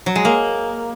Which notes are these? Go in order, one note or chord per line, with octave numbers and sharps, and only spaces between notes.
F#3
G#3
A#3